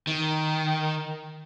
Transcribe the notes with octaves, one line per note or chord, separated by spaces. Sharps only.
D#3